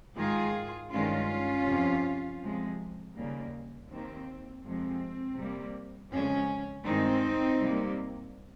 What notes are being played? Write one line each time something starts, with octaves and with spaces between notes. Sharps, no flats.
G#2 D#3 G#3 F4 G#4
G2 D#3 G#3 C#4 F4
F2 C3 F3
C3 F3 G#3
D#2 C#3 G3 A#3
D#2 D#3 A#3 C4
F2 C3 F3 G#3 C4
C3 G3 A#3
F2 C#3 F3 G#3 C#4
G2 D#3 G#3 C4 D#4
C3 G3 A#3